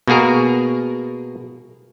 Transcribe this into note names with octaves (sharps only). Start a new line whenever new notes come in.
B2 A#3 F#4 G#4 A#4